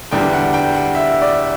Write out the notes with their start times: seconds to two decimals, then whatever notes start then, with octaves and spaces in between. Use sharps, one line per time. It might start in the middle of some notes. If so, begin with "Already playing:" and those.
0.11 E2 D3 G3 G5
0.33 F#5
0.54 G5
0.74 F#5
0.95 E5
1.22 D5